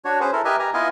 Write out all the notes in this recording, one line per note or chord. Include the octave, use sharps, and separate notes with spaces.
D4 F#4 C#5
C#4 G#4 B4 C5
E4 A4 A#4
G4 A#4 B4 D#5 E5 G#5
G4 G#5 A#5
B3 E4 F4 D#5 F5 G#5